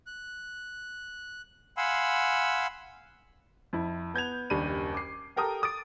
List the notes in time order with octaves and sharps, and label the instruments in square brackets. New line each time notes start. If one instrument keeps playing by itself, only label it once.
[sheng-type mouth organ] F#6
F5 F#5 G#5 B5 C6 E6
[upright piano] F2 E4
B3 G6 G#6 F7
F#1 D#2 G3 D4 B5 D#7
D6 C7
G4 A4 A#4 G5 A5 D#6
D6 D#6 A6 D7